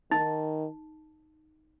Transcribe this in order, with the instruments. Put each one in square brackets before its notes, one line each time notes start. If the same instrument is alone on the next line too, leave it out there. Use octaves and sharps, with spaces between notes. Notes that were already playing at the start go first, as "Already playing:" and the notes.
[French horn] D#3 [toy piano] D#4